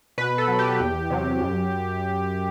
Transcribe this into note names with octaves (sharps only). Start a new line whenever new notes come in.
B2 B4
A4
F#3
G4
E2
C3 F#3
F#2